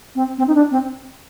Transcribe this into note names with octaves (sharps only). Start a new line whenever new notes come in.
C4
C4
D#4
D4
C4